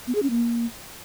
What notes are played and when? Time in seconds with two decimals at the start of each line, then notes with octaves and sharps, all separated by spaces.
0.07 B3
0.15 G#4
0.23 C#4
0.30 A#3